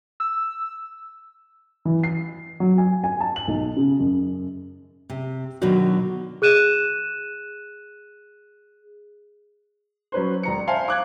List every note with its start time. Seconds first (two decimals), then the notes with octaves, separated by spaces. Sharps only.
0.20 E6
1.85 E3
2.03 C7
2.60 F#3
2.78 G#5
3.04 G#5
3.21 A5
3.36 F#7
3.48 B1
3.77 C#3
4.00 F#2
5.10 C3
5.62 B2 D3 D#3 F#3 D#4 F#4
6.42 G#4 F#6 D#7 E7
10.12 F#3 C#4 B4 C5
10.43 E1 A#5 C#7
10.67 C5 E5 F5 G#5 A5
10.88 D6 F#6 G#6